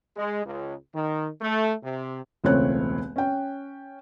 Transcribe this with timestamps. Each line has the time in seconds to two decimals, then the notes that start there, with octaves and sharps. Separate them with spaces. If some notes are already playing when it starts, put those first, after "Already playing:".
0.17 G#3
0.45 C#2
0.93 D#3
1.41 A3
1.83 C3
2.44 E1 C#2 A3 C4 C#5 F#6
3.16 C#4 G5